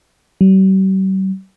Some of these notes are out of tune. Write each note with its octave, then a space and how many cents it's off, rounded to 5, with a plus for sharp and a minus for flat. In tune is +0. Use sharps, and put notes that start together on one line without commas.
G3 -45